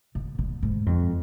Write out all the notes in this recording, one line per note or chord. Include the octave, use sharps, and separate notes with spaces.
D3
D3
G#2
F2